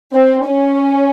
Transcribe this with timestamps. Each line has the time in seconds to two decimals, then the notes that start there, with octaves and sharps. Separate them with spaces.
0.13 C4
0.46 C#4